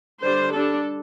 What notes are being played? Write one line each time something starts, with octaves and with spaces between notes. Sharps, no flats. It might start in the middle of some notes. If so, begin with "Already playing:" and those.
D3 G3 D4 C5
G3 D4 A4